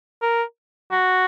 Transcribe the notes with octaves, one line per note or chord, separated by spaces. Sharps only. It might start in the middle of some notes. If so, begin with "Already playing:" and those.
A#4
F#4